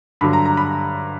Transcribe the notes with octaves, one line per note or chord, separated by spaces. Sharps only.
G2 D3 F#3 B5
A#5
A#5
B5